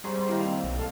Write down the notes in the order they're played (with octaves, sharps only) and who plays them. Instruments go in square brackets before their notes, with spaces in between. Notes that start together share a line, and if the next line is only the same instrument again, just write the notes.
[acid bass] G3 [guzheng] F#4 G#4 [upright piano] C5 A#5 C6
[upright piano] C5 A#5 C6
[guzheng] D#3 A#3 [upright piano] E4 G4
[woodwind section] C4 [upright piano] F7
[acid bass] B1
[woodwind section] A4 F5 A5